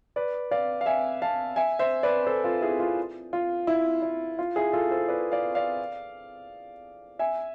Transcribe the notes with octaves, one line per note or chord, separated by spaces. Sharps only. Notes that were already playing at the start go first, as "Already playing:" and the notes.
B4 D5
D5 F5
F5
E5 G#5
F5 A5
E5 G#5
C5 E5
B4 D5
A4 C5
F4 A4
E4 G#4
F4
F4
E4
E4
F4
E4 G#4
F4 A4
A4 C5
B4 D5
D5 F5
D5 F5
E5 G#5